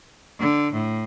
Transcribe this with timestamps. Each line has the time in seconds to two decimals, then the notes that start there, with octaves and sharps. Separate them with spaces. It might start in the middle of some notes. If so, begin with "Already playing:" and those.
0.40 D3
0.73 A2